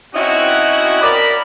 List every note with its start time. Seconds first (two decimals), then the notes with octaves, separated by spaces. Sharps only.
0.14 C4 C#4 D#4 E4 F#4
1.01 A#4 D5 B5